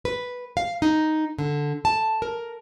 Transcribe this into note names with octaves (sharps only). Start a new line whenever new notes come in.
B4
F5
D#4
D3
A5
A#4